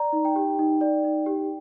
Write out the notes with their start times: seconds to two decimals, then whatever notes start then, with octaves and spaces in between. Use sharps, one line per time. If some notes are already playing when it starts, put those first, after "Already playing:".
Already playing: D5 A#5
0.13 D#4
0.25 G5
0.36 G4
0.59 D#4
0.81 D5
1.04 D#4
1.26 G4